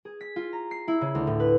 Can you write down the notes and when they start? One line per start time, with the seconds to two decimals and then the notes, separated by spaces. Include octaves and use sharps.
0.05 G#4
0.21 B6
0.36 F4
0.53 A#5
0.71 C7
0.88 E4
1.01 C#3
1.15 D2
1.27 A2
1.40 B4